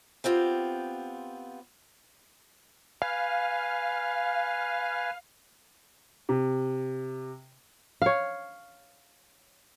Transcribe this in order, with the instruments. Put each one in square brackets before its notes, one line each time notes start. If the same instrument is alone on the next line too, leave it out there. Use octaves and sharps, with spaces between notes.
[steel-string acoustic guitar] B3 C4 F4 G4
[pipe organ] B4 G#5 [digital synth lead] F5
[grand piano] C3
[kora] C#5 F5